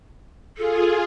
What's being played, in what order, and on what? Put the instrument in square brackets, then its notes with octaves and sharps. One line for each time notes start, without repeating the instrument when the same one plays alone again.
[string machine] F4 G#4 [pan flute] A4